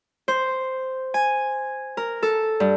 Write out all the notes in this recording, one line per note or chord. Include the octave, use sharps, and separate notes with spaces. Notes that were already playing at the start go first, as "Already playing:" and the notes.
C5
G#5
A#4
A4
G2